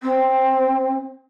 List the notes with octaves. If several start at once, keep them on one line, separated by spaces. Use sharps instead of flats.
C4